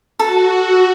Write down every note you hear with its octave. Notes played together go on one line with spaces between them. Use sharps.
F#4 A4